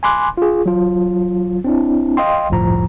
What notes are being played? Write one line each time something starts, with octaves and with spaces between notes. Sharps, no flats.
G#5 B5 C6 D6 F#6
F4 G#4
F#3 F4
C4 D4 E4
D#5 F5 G5 C6
G1 C2 F2 A2 F3 A#5